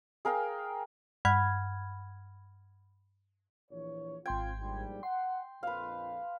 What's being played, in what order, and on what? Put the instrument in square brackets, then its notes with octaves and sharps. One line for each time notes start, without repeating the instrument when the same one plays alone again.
[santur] G#4 A#4 F5 G5
[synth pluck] G2 F#5 B5 F6 G#6
[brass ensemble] A#1 E3 C#5
[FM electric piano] G#1 C6 G#6 [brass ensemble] C4 F4 [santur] G5
[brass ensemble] A#1 G#2 G3
[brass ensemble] F#5 [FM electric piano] C6
[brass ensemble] A#1 F2 [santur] B4 F5